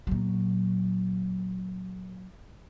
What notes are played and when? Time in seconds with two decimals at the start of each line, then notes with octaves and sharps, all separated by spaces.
0.07 A#2 F#3